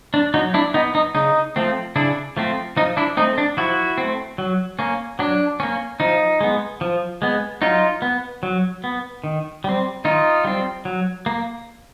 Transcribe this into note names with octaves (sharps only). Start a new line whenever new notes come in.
D4
F#3 D#4
D4 E4
B3 D#4
D#4
C#3 D#4
F3 A3 C4
C#3 D4 E4
F3 A3 C4
F3 D#4
D4 E4
A3 C4 D#4
D4
F3 E4 F#4
C4
A3
F#3
A#3 C#4
F#3 D4
A#3 C#4
F3 D#4
G#3 B3
F3
G#3 B3
F#3 D#4 F4
B3
F#3
B3
D#3
G3 C4
D#3 D#4 F4
G3 C4
F#3
A#3